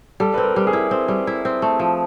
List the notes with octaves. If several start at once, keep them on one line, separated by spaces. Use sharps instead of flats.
G3 A4
C4 B4
A#4
G3
G#4
E4
C4
G3
E4
C4
A3
F3